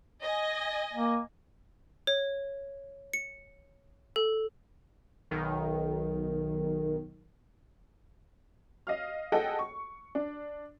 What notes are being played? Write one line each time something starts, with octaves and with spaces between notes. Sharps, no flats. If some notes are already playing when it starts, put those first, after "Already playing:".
D#5 G#5
A#3
C#5
C#7
A4
B1 D#3
D#5 F5 F6
G#4 A4 D#5 F#5 G5
C#6
D4